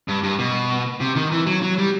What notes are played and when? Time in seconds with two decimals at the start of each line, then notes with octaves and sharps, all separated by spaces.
0.08 G2
0.23 G2
0.39 B2
1.00 C3
1.16 D#3
1.32 E3
1.47 F#3
1.63 F#3
1.78 G3